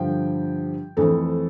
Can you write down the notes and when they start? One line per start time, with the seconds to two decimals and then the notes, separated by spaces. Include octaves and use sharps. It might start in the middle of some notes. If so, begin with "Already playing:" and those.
Already playing: G2 D3 F3 G5
0.97 F2 E3 A3 C4 A4